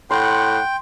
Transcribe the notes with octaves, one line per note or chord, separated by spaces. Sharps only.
A2 F#5 G5 C6